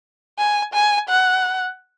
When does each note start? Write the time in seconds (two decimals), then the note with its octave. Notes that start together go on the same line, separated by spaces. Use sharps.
0.38 G#5
0.74 G#5
1.09 F#5